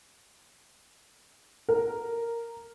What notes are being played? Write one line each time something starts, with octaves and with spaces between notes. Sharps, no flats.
A#4